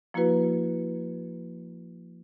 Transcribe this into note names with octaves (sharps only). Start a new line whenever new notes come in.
F3 A#3 E4 F#4 B4